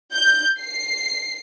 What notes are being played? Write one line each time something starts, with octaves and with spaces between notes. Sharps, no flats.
G6
C7